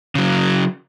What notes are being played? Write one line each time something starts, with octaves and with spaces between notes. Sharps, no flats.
C#3 F#3